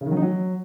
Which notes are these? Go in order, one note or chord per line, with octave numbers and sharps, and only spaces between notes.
C#3
D#3
F#3
D#4
F#3